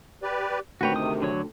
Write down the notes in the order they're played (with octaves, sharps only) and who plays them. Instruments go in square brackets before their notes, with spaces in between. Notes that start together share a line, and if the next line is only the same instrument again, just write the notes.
[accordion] G4 B4 D5
[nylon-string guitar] D2 G5 [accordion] C3 D#3 [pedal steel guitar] F#4 B4 C#5
[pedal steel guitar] D#6
D3 F#3 C#5